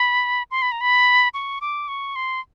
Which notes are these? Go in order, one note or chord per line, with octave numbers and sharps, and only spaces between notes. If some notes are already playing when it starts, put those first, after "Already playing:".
Already playing: B5
C6
B5
A#5
B5
C#6
D6
C#6
C6